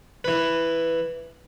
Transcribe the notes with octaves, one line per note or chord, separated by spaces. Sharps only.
E3 B4